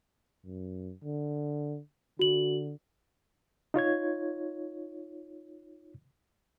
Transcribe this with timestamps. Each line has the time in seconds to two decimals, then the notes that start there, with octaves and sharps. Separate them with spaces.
0.45 F#2
1.04 D3
2.19 D3 F#4 F#7
3.74 D#4 F4 C#5 G#6